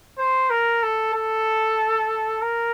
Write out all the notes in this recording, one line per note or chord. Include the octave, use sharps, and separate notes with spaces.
C5
A#4
A4
A4
A#4